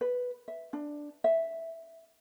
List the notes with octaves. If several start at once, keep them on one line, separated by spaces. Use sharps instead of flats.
B4
E5
D4
E5